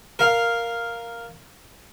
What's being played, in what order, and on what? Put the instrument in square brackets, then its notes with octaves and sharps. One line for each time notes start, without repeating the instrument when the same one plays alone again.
[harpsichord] A#4 F5